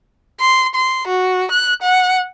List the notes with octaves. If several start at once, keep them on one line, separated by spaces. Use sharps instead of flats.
C6
C6
F#4
F#6
F#5